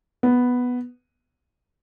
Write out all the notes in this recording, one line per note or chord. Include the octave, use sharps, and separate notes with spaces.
B3